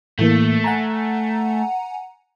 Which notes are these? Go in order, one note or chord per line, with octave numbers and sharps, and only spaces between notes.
A2 E3 A3 A#3
F#5 G#5 A#5